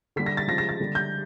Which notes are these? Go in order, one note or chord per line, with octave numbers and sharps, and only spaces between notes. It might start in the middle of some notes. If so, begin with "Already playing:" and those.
D3 G3 B6
A#6
A6
C#3 F3 G#3 A#6
A#6
A6
D3 G3
G6